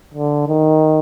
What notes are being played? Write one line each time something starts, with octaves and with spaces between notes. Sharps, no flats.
D3
D#3